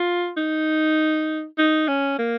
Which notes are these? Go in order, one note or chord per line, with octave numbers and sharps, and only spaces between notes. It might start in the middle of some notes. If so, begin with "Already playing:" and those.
Already playing: F4
D#4
D#4
C#4
A#3